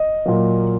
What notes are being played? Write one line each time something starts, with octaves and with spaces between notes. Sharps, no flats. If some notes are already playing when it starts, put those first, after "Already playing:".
Already playing: D#5
A#2 F#3 A#3